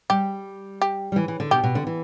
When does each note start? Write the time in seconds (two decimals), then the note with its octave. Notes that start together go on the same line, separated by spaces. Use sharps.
0.10 G3 G4
0.82 G4
1.12 G3
1.16 E3
1.28 E3
1.40 D3
1.51 B2 G4
1.63 B2
1.75 D3
1.87 E3